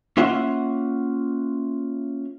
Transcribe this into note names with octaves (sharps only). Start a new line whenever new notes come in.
A#3 C#4 F4 E5 F#5